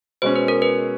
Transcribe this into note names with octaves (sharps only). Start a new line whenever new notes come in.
B2 G#3 C#4 C5
B4
A#4
B4